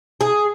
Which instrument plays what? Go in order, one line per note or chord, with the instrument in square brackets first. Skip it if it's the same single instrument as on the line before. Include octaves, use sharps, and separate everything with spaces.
[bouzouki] G#4